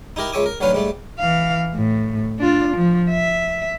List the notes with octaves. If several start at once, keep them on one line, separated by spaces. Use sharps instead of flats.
D#4 E4 G4 A#4
C#2 G#3 C#5 E5 G#5 D6
A#4
A1 D3 F#3 C#4 B4 F5
G#2 G3 A3
E3 F5
A2
D4 F4
F3
E5